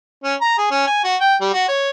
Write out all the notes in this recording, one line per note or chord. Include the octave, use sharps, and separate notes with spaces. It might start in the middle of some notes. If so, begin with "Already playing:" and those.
C#4
A#5
G#4
C#4
G#5
F#4
G5
G3
F#4
C#5